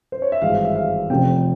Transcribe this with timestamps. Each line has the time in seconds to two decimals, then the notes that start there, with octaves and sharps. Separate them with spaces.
0.12 C5
0.22 C#5
0.32 E5
0.42 G#1 G2 E3 G#3 F5
0.64 E5
0.76 F5
1.10 F1 F2 C3 G5